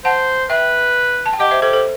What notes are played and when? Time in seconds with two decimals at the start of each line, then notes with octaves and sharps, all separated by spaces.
0.05 C5 F#5 A5
0.50 B4 E5 G5
1.26 A5
1.33 G5
1.40 G4 D#5 F#5
1.51 C5 E5
1.62 G4 A4 C5
1.73 A4 C5